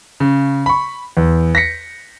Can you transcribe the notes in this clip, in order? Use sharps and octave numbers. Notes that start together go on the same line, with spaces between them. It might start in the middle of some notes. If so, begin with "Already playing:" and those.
C#3
B5 C#6
E2
A#6 B6 C#7